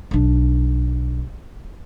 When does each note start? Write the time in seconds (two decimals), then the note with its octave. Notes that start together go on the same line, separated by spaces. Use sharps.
0.11 B1 D4